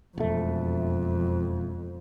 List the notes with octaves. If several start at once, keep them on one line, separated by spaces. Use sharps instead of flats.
E1 F2 A3